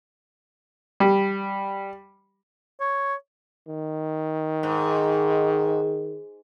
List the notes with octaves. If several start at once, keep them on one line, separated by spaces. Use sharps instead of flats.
G3
C#5
D#3
G#2